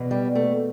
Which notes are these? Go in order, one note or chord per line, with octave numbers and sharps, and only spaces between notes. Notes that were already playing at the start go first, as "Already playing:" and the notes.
Already playing: E2 B2
G3
A3